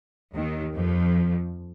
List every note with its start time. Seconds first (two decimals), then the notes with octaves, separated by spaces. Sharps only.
0.34 D#2 D#3
0.75 F2 F3